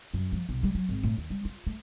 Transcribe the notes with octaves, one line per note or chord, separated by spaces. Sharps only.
F#2
F3
B1
G3
F#3
G#1
A2
D#2
G3
F4
A3